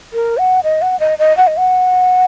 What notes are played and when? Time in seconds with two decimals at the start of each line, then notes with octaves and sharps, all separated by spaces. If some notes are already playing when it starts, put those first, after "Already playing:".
0.13 A#4
0.38 F#5
0.64 D#5
0.82 F#5
1.00 D#5
1.19 D#5
1.37 F#5
1.47 D#5
1.57 F#5